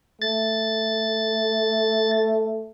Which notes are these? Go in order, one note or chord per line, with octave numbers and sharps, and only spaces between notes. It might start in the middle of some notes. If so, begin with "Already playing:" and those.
A3 A6